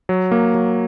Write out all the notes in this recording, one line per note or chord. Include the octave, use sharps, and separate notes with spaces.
F#3
A#3
F#3